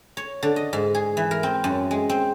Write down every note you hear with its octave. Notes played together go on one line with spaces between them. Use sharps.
C#5
D3
D#5
G#2
G#4
E3
A#4
C4
F#2
G#3
C4